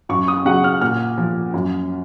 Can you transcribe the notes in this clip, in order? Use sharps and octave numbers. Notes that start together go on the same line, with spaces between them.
F#2 C#6
D#6
C#3 F#3 F#5
F6
A#2 F6
F3
F#2